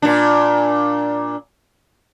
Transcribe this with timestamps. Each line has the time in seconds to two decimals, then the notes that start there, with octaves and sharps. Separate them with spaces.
0.02 A#2 D4